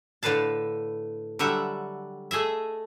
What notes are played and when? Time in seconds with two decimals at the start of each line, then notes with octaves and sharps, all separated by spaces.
0.23 A2 D3 B4 F5 A5
1.39 D3 F#3 G3 E5 F#5
2.31 A3 G#4 D#5 E5